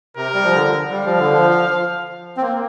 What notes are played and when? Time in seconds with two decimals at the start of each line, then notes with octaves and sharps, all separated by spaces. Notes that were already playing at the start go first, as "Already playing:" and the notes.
0.16 C3 A#4
0.34 G3
0.44 F3
0.54 D3
0.91 G3 F5
1.06 F3
1.19 D3
1.33 F3
2.37 C4
2.42 A#3